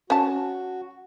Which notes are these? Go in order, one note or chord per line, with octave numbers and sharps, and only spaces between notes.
C#4 F#4 A5